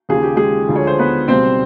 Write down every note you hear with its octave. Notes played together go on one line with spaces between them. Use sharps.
D#2 C#3 F3 G#4
G4
G#3 G#4
D2 D3 F3
C#5
C5
B3 B4
C#2 B2 G3 C4 C5